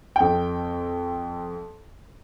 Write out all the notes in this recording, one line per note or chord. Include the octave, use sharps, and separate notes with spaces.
F2 G5